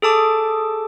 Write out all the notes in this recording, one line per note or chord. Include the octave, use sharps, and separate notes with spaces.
G#4 A4 A5 D6